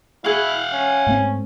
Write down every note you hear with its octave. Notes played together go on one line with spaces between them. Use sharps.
E4 F#4 G#4 F5 F#5
C#4
G#2 A3 C4